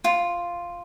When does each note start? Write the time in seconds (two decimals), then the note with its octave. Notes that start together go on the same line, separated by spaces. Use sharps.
0.04 F4